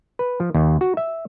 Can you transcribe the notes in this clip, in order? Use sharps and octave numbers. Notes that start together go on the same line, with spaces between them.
B4
F3
D#2
F#4
E5